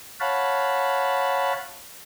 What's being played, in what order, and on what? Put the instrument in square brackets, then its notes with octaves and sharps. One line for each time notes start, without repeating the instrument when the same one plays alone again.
[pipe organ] C#5 F5 F#5 A5 B5